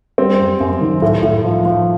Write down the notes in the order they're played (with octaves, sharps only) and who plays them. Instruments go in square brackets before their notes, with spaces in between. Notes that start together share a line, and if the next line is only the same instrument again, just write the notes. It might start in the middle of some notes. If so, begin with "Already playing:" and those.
[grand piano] G3 C4
F#2
F#2
D#3
A2
A2
F3
F3